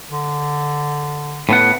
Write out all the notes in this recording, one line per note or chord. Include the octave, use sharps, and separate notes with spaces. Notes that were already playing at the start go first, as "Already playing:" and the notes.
D3
A2 B3 F#5